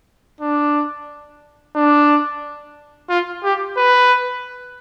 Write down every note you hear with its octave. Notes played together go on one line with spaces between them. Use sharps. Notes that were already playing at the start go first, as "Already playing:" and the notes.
D4
D4
F4
G4
B4